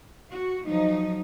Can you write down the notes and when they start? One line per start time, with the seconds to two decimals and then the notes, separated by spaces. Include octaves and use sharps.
0.30 F#4
0.65 F3 F#3 D#4